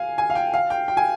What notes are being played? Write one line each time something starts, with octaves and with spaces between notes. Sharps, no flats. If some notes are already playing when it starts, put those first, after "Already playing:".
Already playing: F5 G#5
G#5
F5
G5
F5
G5
G5
G#5